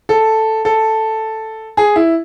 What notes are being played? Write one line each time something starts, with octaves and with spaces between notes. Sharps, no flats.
A4
A4
G#4
E4